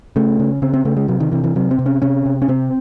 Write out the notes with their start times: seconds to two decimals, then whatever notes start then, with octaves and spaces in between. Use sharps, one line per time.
0.16 C#3 A3
0.40 C#3
0.62 C#3 C4
0.74 C4
0.85 C#3 A3
0.97 G#3
1.08 C3 F#3
1.20 D#3
1.32 C3 E3
1.44 E3
1.56 C3 F#3
1.71 C4
1.79 C3
1.86 C#4
2.02 C3 C#4
2.25 C3
2.42 C#4
2.48 C3 C4